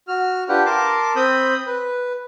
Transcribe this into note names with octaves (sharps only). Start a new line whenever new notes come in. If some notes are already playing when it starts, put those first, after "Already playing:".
F#4 F6
D4 F4 G4 B4 F#5 G5
A#4 A5 C6 D6
C4 B5 D#6 G6
B4